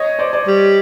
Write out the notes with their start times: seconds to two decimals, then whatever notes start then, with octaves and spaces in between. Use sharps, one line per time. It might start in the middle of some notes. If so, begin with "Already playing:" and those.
Already playing: C#5 D#5
0.19 C5 D5
0.33 C5 D5
0.47 G3